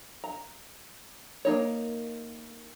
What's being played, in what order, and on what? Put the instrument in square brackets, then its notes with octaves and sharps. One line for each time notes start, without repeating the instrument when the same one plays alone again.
[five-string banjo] A#5
A#3 D#4 C#5